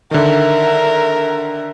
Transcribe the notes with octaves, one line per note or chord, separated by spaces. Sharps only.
D3 D#3 A#4 E5